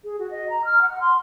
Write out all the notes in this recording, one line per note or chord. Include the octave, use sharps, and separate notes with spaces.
G#4
F#4
D#5
A#5
F6
F#5
C6